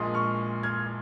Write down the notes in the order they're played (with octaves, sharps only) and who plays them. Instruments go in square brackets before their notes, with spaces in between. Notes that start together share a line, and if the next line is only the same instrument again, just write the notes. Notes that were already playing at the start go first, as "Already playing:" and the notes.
Already playing: [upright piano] A#1 A#2 F3 G#3 C6 D#6
C#6 F6
F6 G#6